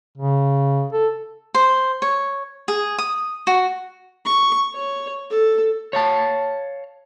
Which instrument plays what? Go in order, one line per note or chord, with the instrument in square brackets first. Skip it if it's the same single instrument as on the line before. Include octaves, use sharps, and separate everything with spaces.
[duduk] C#3
A4
[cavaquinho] C5
C#5
G#4
D#6
F#4
[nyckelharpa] C#6
C#5
A4
[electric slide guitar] C#5 F5 A5